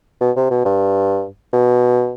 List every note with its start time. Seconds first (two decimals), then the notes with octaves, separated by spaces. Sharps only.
0.21 B2
0.36 C3
0.50 B2
0.65 G2
1.53 B2